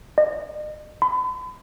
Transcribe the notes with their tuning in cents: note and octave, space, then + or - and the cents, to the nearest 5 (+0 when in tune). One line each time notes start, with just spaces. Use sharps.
D#5 -40
B5 +45